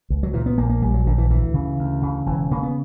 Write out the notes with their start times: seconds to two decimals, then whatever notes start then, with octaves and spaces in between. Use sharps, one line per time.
0.10 C#2
0.23 F#3
0.33 A#2 E3
0.46 B3
0.57 A#1 A#3
0.69 A#3
0.82 A#1 G3
0.94 F#3
1.06 A#1 D3
1.18 E3
1.30 D2 E3
1.54 C#3
1.79 D2
2.02 C#3
2.26 E1 E3
2.51 C#3 A#3
2.63 B3